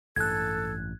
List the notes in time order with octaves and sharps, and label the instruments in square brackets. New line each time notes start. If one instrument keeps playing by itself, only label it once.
[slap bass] A1 G2 [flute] A4 [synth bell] F#6 G#6